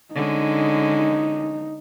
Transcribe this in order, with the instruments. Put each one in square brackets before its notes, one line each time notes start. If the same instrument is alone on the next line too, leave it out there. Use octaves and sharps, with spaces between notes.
[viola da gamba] D3 G#3 C#4 [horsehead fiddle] D#4